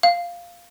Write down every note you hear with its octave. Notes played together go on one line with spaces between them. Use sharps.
F5